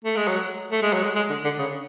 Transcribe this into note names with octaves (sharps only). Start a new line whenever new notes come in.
A3
G#3
F#3
A3
G#3
F#3
G#3
G#3
D3
D3
C#3